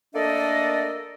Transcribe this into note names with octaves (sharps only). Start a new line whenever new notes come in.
A3 A#3 D4 A4 D5 D#5